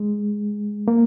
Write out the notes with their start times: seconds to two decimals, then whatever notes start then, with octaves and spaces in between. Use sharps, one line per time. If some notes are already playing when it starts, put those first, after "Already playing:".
Already playing: G#3
0.88 A#3